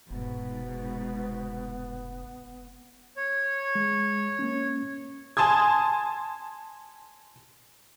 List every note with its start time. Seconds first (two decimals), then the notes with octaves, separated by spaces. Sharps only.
0.10 F1 G#2 B2 B3
3.17 C#5
3.75 G#3
4.39 A#3 C#4
5.37 G#5 A5 C6 D#6 G#6